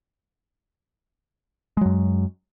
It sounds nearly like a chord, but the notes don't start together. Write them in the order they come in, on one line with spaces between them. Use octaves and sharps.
G#3 F#3 F#2